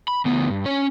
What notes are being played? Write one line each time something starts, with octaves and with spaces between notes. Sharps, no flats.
B5
D2 B3
G2
C#4 C#5